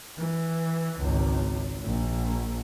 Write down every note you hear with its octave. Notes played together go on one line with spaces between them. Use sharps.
E3
G#1 C#2
A#1